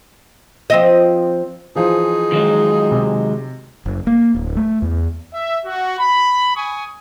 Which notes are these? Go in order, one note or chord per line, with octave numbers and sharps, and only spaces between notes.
F3 C4 D#5
E3 F3 D#4 F4 G#4 C5
D#3 F#3 G#3
C3
F#1
A#3
D1
A3
E2
E5
F#4
B5
G#5 C#6 D#6